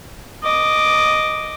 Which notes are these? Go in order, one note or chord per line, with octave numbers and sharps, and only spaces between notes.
D#5 D6